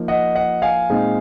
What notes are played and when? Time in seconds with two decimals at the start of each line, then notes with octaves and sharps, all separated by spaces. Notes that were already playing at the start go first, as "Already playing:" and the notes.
Already playing: F3 A#3 D#4
0.08 D#5 F#5
0.35 D#5 F#5
0.62 F5 G#5
0.90 A#2 G#3 C4 D#4